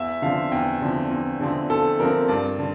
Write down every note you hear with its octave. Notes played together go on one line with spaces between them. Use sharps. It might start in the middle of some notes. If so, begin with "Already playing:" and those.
Already playing: E2 E5
D3 F3 C4 F5
E2 G5
D3 F3 C4
E2
D3 F3 C4
E2 A4
D3 F3 C4 A#4
G2 D5
D3